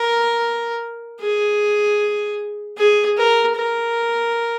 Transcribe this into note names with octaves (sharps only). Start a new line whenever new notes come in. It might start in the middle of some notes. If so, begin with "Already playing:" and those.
Already playing: A#4
G#4
G#4
A#4
A#4